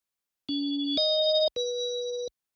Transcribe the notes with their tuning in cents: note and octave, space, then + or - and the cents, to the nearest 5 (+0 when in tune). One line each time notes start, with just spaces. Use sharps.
C#4 +45
D#5 -5
B4 -25